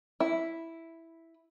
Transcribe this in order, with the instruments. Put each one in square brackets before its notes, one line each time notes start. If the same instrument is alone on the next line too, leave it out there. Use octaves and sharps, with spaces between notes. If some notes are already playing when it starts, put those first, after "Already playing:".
[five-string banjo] E4